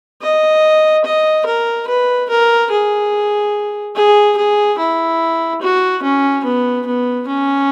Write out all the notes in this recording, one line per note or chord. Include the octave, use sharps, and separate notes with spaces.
D#5
D#5
A#4
B4
A#4
G#4
G#4
G#4
E4
F#4
C#4
B3
B3
C#4